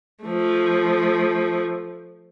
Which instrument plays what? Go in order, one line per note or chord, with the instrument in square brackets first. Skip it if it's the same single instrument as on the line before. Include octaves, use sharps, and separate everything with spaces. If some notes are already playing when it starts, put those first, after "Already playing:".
[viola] F3 A3